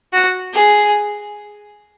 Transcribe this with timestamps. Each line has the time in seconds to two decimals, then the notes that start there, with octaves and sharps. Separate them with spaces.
0.13 F#4
0.54 G#4